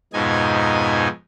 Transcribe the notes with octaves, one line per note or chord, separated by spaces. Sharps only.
F2 G#2 B2 D#4 G#5